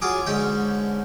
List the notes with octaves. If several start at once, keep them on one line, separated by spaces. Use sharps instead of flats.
F#3 F4 G#4 G#5 D6
G#2 D3 C#4 G5